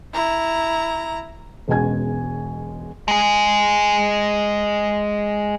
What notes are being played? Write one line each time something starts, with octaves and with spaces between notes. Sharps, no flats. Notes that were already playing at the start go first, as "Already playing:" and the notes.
E4 A#5
E1 B2 G#3 C#4 G#5 G#6
G#3 G#4